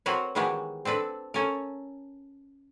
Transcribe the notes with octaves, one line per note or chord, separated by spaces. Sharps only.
C4 F#4 A#4 B4 C#5
D#3 E3 G#3 B3 F#4 G4
C4 D4 A4 B4
C#4 A4 A#4